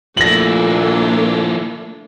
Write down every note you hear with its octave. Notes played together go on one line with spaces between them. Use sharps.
A#2 F3 A3 A#3 D4 E4 A#6 F#7